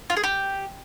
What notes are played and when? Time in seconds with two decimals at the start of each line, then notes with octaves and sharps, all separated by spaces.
0.10 F4
0.17 G#4
0.24 G4